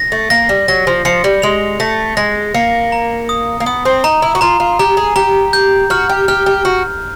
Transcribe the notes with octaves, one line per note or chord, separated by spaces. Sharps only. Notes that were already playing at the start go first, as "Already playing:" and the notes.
Already playing: A#6
A3
A#3 A#6
G3
F#3 A#6
F3
F3 C#7
G3
G#3 F7
A3 A#6
G#3 A#6
A#3 C#7
A#5
D#6
A#3
B3 D#6
C4
D#4 A#5
E4
F#4
F4 A#5
F4
G4 A#5
G#4
G4 A#5
G6
F#4 F6
G4
G4 F6
G4
F#4